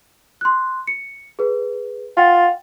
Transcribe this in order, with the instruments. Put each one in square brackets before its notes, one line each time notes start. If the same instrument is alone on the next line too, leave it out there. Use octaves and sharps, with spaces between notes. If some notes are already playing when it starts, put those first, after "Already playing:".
[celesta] C6 F#6
C#7
G#4 B4
[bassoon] F4 [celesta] F#5 G5 A6